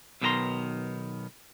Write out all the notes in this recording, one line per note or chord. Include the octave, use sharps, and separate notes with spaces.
B1 B2 D#3 G4 A#5 C6